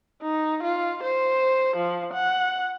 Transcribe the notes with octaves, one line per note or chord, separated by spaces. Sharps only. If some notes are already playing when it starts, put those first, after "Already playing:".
D#4
F4
C5
F3
F#5